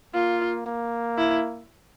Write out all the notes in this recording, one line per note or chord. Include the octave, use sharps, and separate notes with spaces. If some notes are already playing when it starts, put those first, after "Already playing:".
A#3 F4
A#3
E4